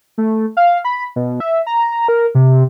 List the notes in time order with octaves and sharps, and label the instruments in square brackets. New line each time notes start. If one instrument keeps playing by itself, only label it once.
[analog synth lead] A3
F5
B5
B2
E5
A#5
A#4
C3